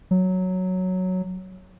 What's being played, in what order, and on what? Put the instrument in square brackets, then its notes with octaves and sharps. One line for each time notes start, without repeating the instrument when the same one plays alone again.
[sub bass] F#3